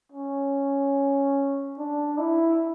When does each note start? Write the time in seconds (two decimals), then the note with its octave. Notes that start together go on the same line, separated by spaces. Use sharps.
0.12 C#4
1.78 D4
2.18 E4